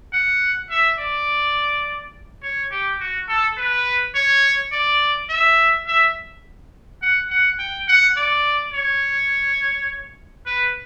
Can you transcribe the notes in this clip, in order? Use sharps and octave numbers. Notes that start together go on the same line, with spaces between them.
F#5
E5
D5
C#5
G4
F#4
A4
B4
C#5
D5
E5
E5
F#5
F#5
G5
F#5
D5
C#5
B4